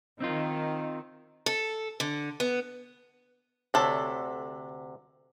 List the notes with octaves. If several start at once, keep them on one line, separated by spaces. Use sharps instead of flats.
D#3 C4 D#4 F4
A4
D3
B3
D2 C3 D4 A4 C#5